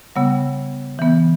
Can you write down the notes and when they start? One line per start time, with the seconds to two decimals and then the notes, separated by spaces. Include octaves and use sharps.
0.16 C#3 G3 B3 F#5
0.99 E3 B3